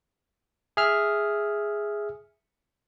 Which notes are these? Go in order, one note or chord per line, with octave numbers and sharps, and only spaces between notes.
G#4 E5 F6